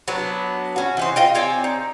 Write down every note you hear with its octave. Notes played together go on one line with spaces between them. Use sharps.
F#3 B3 D4
C#4 F#4
E3 D#4 C5
F4 D#5 G5
C4 C#5 D5 G#5
D#4